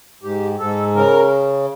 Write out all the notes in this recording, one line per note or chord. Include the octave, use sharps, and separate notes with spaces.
G#2 G4
G#2 A4
C#3 A#4